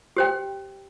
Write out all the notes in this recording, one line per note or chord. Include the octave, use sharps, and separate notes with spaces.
G4 C5 G5